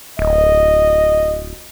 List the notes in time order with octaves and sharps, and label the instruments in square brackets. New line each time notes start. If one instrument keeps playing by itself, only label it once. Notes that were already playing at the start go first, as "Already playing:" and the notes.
[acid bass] D1 [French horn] D#5